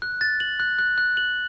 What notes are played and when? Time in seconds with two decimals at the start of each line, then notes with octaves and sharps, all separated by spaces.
0.02 F#6
0.21 A6
0.40 F#7
0.60 F#6
0.79 F#6
0.98 F#6
1.17 F#7